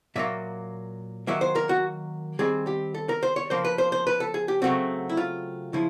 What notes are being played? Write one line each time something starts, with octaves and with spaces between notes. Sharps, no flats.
A#2 F#3 A#3 E5
D#3 F#3 A#3 E5
C5
A#4
F#4
D#3 G3 C4 G#4
G4
A4
A#4
C5
C#5
C#3 F3 A#3 C5
B4
C5
C5
B4
A4
G#4
G4
C#3 F#3 A3 C4 F#4
E4
F4
C#3 F3 E4